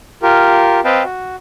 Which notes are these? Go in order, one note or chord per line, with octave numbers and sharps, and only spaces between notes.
F4 G4 A#4
C4 B4 D#5 F5 G5 A5
F#4